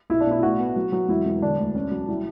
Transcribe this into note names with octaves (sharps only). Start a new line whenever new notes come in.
B1 E4
D4
B2 E4
E4
A2 F#4
B3
F#3
F#3
E1 E4
E1
D3 D4
D2
C#4
F#3
G3 E4